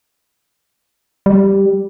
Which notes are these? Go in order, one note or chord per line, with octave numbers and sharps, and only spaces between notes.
G3